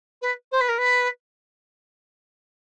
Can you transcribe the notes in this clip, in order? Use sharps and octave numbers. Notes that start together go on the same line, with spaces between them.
B4
C5
B4
A#4
B4